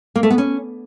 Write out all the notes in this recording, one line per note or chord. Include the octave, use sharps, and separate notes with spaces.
A#3
A3
B3
C#4